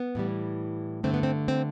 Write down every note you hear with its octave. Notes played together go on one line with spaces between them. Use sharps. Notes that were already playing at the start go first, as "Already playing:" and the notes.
Already playing: B3
A2 E3 G3
G2 D3 A3 C4
B3
C4
C4